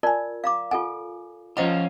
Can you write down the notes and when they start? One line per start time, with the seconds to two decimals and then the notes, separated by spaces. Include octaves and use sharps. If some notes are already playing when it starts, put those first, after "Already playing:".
0.03 F4 A#4 D5 G#5 A5
0.44 F5 A#5 D6
0.71 F4 A4 F#5 G#5
1.57 F3 C#4 F4 C5 D#5 F#5 A#5